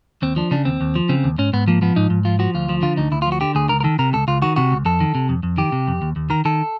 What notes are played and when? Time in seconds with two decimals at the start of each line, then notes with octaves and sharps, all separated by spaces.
0.22 D#2 C4
0.36 F3 D4
0.51 C#3 D4
0.65 D#2 C4
0.81 D#2
0.95 F3
1.09 C#3 C4
1.24 D#2
1.38 G#2 C#4
1.53 G#2 B3
1.68 F3 A#3
1.82 F3 B3
1.96 G#2 D#4
2.10 G#2
2.25 F3 F4
2.39 F3 F#4
2.54 D2 F4
2.69 F3
2.82 D3 F4
2.97 D2 D#4
3.12 D2 E4
3.22 F4
3.26 F3
3.32 F#4
3.41 D3 G4
3.55 D2 G#4
3.69 C#2 A#4
3.80 A#4
3.84 D#3 A4
3.99 C3 A#4
4.13 C#2 A4
4.28 C#2 F4
4.42 D#3 F#4
4.56 C3 F#4
4.72 C#2
4.85 F2 A4
5.00 D#3
5.15 C3
5.29 F2
5.43 F2
5.58 D#3 G4
5.72 C3
5.88 F2
6.02 D#2
6.16 D#2
6.30 D#3 A#4
6.45 D#3 A4